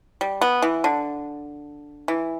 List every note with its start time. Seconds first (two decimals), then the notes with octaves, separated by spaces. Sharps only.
0.21 G3
0.41 B3
0.62 E3
0.84 D3
2.08 E3